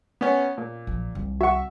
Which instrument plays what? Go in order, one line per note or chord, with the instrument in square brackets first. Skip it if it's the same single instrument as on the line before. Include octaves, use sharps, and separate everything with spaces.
[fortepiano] B3 C#4
A#2
[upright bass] A#1 F3
C2 D#3
[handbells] F#4 F#5 [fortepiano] E5 C#6